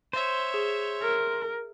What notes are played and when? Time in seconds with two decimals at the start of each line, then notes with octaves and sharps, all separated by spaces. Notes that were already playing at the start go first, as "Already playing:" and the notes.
0.13 C5 C#5 E5
0.54 G#4
1.01 A#4